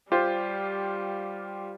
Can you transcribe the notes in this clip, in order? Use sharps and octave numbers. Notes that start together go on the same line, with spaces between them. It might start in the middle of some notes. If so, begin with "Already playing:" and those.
G3 F4 G4 C5